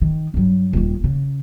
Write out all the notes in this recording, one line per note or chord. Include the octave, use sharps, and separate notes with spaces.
D#3
G2 F#3
D#1 D#2
C#3